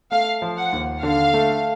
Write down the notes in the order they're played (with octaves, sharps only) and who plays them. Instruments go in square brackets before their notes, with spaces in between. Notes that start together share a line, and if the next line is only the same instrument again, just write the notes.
[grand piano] A3 [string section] F5
[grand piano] F3
[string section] F#5
[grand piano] D#2
[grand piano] D3 [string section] F5
[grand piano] A3